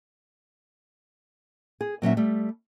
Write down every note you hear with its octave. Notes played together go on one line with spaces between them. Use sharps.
G#4
A#2 F#3 C#4 E5
G3 A3